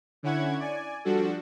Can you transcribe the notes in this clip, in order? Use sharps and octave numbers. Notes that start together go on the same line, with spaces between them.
D3 C#4 E4 F#5 C#6 G#6
D5 G#5
F3 G3 D4 F#4 A4